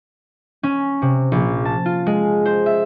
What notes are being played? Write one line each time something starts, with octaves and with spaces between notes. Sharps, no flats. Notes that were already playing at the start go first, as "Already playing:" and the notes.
C#4
C3
A#1
A5
F4
G#3
C5
E5